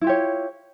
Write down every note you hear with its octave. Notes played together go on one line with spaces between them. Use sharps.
E4 F4 G4 C#5